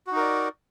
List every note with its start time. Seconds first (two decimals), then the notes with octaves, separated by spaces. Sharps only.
0.07 F#4
0.12 D#4
0.16 A#4
0.21 D5